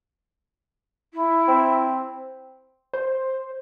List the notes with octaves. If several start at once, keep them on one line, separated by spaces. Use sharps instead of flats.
E4
C4
C5